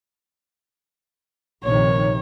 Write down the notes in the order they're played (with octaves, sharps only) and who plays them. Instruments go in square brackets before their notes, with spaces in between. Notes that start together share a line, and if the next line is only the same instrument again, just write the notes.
[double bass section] A#1 C3 D#3 [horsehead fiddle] C#5